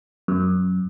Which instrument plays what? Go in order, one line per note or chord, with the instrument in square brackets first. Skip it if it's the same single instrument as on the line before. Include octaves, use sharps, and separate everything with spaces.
[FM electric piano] F#2